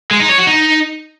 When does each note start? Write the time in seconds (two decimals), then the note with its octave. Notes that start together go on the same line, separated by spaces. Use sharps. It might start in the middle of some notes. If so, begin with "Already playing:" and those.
0.11 G#3
0.20 D#4
0.29 C#5
0.38 F#4
0.47 D#4